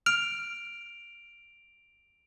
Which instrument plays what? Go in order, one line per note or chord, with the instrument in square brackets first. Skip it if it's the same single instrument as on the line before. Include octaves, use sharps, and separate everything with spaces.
[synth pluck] F6 [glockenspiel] D7 F7